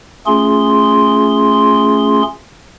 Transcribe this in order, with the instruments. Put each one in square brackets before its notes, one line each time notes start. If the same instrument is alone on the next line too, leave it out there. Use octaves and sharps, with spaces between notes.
[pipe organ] A3 C#4 F4 G#4 C6